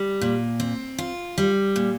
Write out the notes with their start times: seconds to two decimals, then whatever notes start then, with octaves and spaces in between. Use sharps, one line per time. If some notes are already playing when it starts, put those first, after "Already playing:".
Already playing: G3
0.21 A#2
0.60 C4
0.98 F4
1.38 G3
1.76 A#2